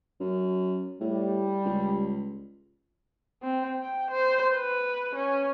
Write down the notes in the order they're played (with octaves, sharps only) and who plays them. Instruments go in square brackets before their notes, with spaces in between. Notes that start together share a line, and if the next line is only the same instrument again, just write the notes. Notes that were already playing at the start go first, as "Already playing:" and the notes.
[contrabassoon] F#2
[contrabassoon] A2 [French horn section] G3
[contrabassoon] C#2
[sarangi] C4
G5
C5
B4
C#4